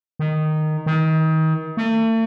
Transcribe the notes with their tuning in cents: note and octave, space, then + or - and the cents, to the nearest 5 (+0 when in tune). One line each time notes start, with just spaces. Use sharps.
D#3 -10
D#3 +30
A3 +40